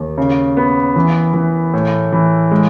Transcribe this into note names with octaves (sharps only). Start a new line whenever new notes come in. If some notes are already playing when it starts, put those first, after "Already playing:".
Already playing: D#2
C#3
B3
E3
E3
A2
E3
G#3